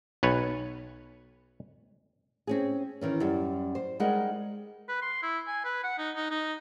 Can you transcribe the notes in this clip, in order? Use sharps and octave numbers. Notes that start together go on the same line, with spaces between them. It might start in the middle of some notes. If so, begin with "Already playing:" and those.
B1 B4 C#5
C4 C#4 G#4
D#3 E3 C#4
F#2 G3
C5
G3 G#3 D#4 G#4 A#4 F#5
B4
C6
E4
G#5
B4
F#5
D#4
D#4
D#4